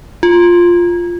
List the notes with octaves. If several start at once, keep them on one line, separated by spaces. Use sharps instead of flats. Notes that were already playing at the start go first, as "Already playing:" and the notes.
F4